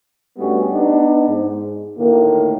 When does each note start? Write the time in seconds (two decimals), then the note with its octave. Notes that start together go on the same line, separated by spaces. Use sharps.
0.37 G2 G3 A3 B3 C#4 F#4
0.71 B3 D4 D#4
1.27 G#2
1.97 D2 A2 D#3 A#3